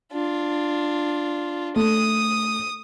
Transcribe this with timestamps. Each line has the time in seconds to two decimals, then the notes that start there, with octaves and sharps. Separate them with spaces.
0.13 D4 F4
1.76 A3 D#6